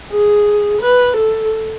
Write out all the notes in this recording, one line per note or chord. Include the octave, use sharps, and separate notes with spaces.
G#4
B4
A4